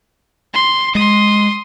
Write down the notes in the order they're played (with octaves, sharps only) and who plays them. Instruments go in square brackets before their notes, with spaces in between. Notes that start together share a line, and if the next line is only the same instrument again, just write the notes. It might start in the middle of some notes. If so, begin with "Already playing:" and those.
[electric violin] C6
[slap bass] G#3 [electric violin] C6 D#6